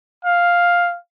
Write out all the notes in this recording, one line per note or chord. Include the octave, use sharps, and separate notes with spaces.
F5